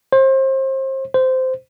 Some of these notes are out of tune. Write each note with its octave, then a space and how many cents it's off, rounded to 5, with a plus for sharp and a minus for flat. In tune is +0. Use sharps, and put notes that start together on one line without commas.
C5 +30
C5 -15